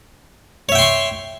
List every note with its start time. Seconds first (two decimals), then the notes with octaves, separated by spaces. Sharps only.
0.69 C#5
0.72 E5
0.75 G5
0.78 C6
0.82 C#6